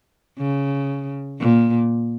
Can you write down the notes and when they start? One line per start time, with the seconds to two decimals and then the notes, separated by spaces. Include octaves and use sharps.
0.38 C#3
1.39 A#2